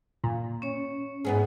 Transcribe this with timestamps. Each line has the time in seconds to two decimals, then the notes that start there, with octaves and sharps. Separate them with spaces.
0.24 A#2
0.62 C#4 C#5
1.25 G#2 B3 G#4